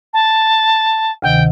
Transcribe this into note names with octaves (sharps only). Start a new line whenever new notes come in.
A5
D2 C3 D#3 G5